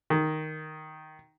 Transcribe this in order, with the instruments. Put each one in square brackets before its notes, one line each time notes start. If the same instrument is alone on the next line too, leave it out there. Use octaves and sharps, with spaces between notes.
[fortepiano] D#3